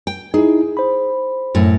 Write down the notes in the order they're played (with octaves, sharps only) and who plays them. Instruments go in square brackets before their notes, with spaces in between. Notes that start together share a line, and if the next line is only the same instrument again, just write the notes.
[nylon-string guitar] G5
[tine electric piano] D#4 E4 [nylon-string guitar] G#4
[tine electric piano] C5 B5
[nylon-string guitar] F#2 A2